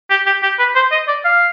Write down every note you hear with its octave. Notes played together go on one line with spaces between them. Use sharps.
G4
G4
G4
B4
C5
D#5
D5
F5